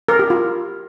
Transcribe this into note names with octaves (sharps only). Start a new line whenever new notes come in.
A#4
G4
F4